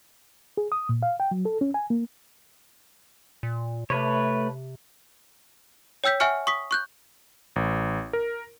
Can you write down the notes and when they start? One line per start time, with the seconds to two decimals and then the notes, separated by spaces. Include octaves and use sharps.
0.57 G#4
0.72 D#6
0.89 A#2
1.03 F5
1.20 G5
1.31 F#3
1.45 A4
1.61 C#4
1.74 G#5
1.90 A#3
3.43 A#2
3.90 C3 A3 B4 C#5
6.04 C#5 G5 E6 G6 B6
6.20 E5 F#5 G#5 C#6 F6 C#7
6.47 C#6 D#6 B6
6.71 C#6 F#6 G6
7.56 A1
8.13 A#4